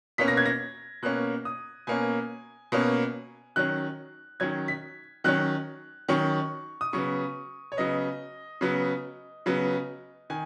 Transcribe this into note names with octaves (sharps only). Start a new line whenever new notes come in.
B2 A#3 C#4 B6
A#6
G#6
A#6
B2 A#3 C#4 F#6
D#6
B2 A#3 C#4 G#5
B2 A#3 C#4
D#3 F#3 C#4 F#6
D#3 F#3 C#4 G#6
B6
D#3 F#3 C#4 F#6
D#3 F#3 C#4 C#6
D#6
C#3 F#3 B3 C#6
C#5
C#3 F#3 B3 D#5
C#3 F#3 B3
C#3 F#3 B3
D#3 G#5